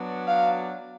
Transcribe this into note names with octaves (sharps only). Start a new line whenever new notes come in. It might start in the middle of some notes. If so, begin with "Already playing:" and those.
Already playing: F#3 B3 D4
F5